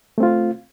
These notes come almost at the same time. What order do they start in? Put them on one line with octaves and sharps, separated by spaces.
A3 C4 F4